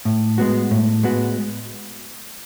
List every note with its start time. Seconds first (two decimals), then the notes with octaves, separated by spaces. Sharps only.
0.05 A2
0.38 G#3 B3 F#4
0.71 A2
1.03 G#3 B3 F#4